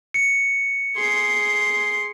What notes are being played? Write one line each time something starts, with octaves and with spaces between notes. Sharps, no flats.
C#7
G#4 C6